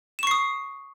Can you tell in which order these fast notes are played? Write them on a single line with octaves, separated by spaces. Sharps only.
E7 C#6 C7 D#6